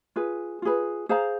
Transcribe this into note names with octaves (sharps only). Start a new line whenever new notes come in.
F4 G#4 B4
F4 G#4 B4
G#4 C5 F5 A#5